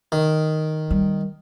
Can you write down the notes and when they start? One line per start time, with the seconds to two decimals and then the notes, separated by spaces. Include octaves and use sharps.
0.12 D#3
0.91 G3